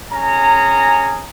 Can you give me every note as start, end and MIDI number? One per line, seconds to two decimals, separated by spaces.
0.13 1.24 61
0.13 1.24 68
0.13 1.24 82